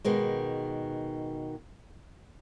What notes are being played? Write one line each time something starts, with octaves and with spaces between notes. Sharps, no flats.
B2 D#3 G#3